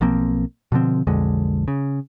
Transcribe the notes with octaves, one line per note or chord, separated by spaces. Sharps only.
B1 F3 A#3 C4
B2 D3 F3 C4
B1 F2 D3 G#3
C#3